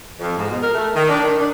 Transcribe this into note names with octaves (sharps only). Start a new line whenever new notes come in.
F2
G#2
B2
A#4
A3
D#3
D4
D#3
D4